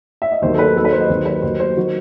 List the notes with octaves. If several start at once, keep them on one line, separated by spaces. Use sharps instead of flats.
E5
D#5
D#2 D#3 F#3 C5
A4
B4
D#2 D#3 F#3 A4
B4
C5
D#5
D#2 D#3 F#3 C5
B4
D#2 D#3 F#3 C5
C5
D#3 F#3 F#4